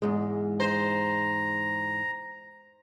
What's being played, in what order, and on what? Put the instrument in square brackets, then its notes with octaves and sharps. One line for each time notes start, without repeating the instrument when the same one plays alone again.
[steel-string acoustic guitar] E2 G#2 G#3
[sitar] C5 [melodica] A#5